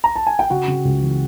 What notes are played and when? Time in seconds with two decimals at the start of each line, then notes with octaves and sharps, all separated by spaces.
0.04 A#5
0.16 A5
0.27 G#5
0.39 G5
0.50 C#3 F#4 F#5
0.68 C#3
0.85 C#2
1.02 E3